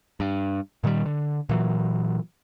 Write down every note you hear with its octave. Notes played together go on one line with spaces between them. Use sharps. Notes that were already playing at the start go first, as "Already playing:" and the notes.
G2
A#2 D#3 F#3 G3
D3
A#2 E3 F#3